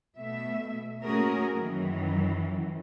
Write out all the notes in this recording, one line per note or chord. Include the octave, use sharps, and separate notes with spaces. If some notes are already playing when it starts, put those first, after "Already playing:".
B2 A3 E5
A3 A#3 C#4 F#4 G#4 A#4
F#2 D#3 E3 F#3